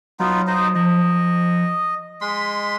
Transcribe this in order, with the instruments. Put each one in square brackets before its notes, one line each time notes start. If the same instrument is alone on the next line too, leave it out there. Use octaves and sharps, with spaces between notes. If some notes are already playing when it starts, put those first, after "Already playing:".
[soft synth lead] F#3 [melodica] B3 D#4 F4
[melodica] D#4 C5 D#5
[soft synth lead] F3 [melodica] D#5
[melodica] G#3 C6 [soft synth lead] B6